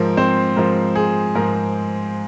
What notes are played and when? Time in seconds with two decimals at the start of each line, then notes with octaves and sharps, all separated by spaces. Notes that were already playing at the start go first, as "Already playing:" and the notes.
Already playing: G#2 F3 A#4
0.17 C4 C5
0.56 G#2 F3 A#4
0.96 G#4
1.35 G#2 F3 A#4